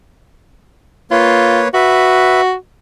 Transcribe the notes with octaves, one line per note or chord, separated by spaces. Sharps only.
A#3 F4 B4 C#5
F#4 B4 E5